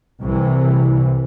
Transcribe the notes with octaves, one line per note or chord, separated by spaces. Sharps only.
C2 C3 E3